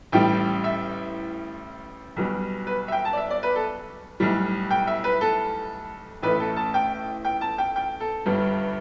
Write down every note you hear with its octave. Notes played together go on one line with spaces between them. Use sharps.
A1 A2 G3 G5
E5
B1 B2 G3
B4
E5
G5
A5
D5
E5
D5
B4
A4
B1 A2 G3
G5
E5
B4
A4
A1 A2 A3 B4
A4
A5
G5
G5
A5
G5
G5
A4
G1 G2 G3